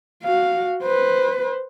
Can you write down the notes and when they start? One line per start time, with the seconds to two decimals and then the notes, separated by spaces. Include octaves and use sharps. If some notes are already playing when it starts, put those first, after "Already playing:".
0.24 F#4 F5
0.83 B4 C5